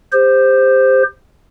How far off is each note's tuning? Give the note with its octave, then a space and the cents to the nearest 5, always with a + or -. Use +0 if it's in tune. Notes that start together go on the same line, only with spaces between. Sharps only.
G4 +30 C5 +0